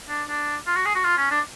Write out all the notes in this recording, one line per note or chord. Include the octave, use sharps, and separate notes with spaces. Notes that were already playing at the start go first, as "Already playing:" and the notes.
D4
D4
F4
F#4
G#4
F#4
F4
C#4
D4